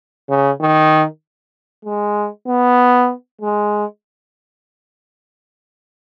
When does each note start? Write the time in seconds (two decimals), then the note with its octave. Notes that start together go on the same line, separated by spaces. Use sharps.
0.29 C#3
0.61 D#3
1.85 G#3
2.48 B3
3.41 G#3